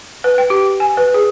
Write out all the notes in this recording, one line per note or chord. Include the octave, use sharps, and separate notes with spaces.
B4
G5
G4
G#5
B4
G#4